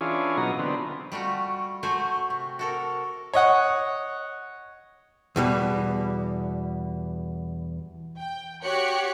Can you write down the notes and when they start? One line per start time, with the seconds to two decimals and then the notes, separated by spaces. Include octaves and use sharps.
0.01 E3 C#4 D4 F4 G#4
0.37 B2 F#3 D#4 A#5
0.59 D3 B3 C4
1.12 G3 A3 F4 F#4
1.83 A3 F#4 C5 G#5
2.30 C3
2.59 F#4 A4 A#4
3.34 C#5 D#5 F#5
5.36 E2 B2 G3
8.17 G5
8.63 F#4 G4 C#5 C#6 F#6 C#7